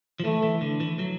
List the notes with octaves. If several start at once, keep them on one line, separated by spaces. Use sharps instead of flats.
F3
E3 A3
E3
D3
E3
F#3